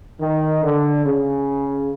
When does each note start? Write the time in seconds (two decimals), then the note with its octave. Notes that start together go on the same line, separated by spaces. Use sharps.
0.20 D#3
0.62 D3
1.04 C#3